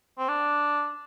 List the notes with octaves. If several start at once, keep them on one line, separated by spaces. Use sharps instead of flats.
C4
D4